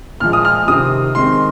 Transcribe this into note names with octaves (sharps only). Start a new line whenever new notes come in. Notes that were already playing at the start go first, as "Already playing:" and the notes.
A#2 F3 G#3 F6
D#6
F6
C3 D#3 C4 D#6
D#3 G#3 C4 C6